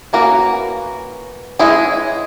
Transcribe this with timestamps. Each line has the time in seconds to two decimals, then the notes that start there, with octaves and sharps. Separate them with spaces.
0.13 E3 A#3 C#4 F#4 A#4
1.59 E3 G#3 C#4 E4 G#4